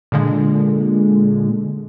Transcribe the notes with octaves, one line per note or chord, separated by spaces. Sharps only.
A#2 D3 G#3